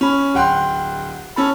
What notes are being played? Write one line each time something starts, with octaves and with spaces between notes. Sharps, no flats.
C#4 B5
D1 F#5 G5 C6 F#6
C#4 A4 B5